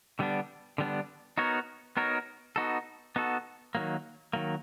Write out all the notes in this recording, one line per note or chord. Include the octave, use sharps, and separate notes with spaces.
D3 G3 B3 D4
D3 G3 B3 D4
B3 D#4 F#4 A#4 C#5
B3 D#4 F#4 A#4 C#5
B3 D#4 F#4 A4
B3 D#4 F#4 A4
D#3 F#3 A#3
D#3 F#3 A#3